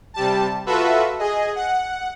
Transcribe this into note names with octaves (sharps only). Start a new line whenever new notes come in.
C3 G3 A5
F4 F#4 A4 B4 E5
G#4 D#5
F#5